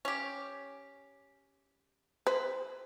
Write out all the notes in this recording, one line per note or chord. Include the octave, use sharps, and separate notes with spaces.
C#4 G4
B4 C5